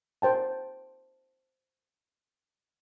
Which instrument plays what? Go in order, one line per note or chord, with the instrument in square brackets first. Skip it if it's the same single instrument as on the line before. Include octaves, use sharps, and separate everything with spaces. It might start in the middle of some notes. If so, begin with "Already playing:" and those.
[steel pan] A#4 C5 G5 A5